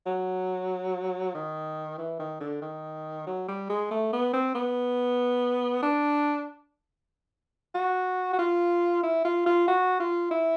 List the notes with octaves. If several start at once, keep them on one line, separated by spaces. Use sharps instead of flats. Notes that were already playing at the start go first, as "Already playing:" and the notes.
F#3
D#3
E3
D#3
D3
D#3
F#3
G3
G#3
A3
B3
C4
B3
D4
F#4
F#4
F4
E4
F4
F4
F#4
F4
E4